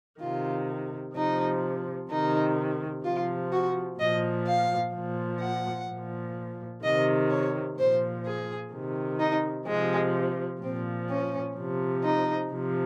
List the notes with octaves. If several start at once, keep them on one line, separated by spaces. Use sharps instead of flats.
C3 D#3 F4
C3 F3 D#4
C3 D#3 D#4
C3 F3 F4
F#4
A#2 F3 D#5
F5
A#2 F3
F#5
A#2 F3
C3 D#3 D#5
C#5
A#2 F3 C5
G#4
C3 D#3
D#4
C3 F3 G#3
A#2 F3 C4
C#4
C3 F3
D#4
C3 F3